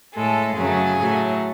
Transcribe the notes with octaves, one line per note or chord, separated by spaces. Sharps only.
A2 G#3 A4
F#2 C#3 F#3 A3 G#4
A2 F#3 A3